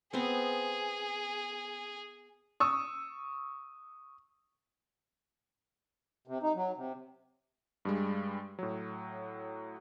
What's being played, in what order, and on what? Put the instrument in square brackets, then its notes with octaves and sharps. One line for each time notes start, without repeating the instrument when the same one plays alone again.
[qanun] B3 C4 [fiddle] G#4
[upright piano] C#6 D#6 E6
[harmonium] C3
D#4
F#3
C3
[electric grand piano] G2 G3 G#3
A2 F#3